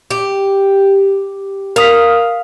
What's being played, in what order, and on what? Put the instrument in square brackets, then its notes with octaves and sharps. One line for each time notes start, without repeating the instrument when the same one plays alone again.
[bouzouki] G4
[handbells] A#4 D#6 B6 [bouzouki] F5